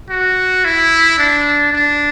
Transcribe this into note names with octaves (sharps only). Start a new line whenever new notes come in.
F#4
E4
D4
D4